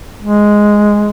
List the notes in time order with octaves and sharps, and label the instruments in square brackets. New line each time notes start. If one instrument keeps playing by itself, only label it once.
[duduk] G#3